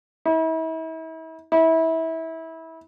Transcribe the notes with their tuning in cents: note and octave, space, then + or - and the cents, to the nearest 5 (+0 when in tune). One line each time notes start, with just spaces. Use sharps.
E4 -40
E4 -25